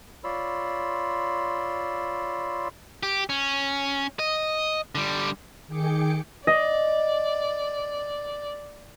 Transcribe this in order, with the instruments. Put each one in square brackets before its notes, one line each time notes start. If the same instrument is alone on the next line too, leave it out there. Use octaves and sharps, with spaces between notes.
[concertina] F4 C#5 D5 B5 C6 E6
[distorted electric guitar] G4
C#4
D#5
D3 G3
[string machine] D#3 G#4 G5 D6 C#7
[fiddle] D5 [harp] D#5